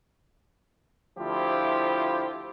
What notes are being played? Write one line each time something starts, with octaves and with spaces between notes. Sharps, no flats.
D2 F3 E4 F4 G4 C5